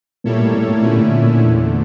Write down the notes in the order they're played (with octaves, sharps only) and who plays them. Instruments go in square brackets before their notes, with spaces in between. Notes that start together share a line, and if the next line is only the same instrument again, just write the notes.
[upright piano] A#2 [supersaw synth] G3 A#3 E4 A4 C#5
[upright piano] A2
A2
A2
[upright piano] A#2 [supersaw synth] D3 A3 C#4 E4
[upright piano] A2
A#2
[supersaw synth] E2 D3 A3